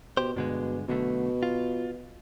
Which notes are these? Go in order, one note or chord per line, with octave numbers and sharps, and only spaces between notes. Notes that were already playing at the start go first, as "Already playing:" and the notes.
B2 G4 C5
G2 B2 D3 G#3
B1 B2 D3 A3
F4